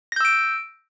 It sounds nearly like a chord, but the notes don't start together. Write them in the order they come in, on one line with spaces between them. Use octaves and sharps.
A#6 G6 E6 D7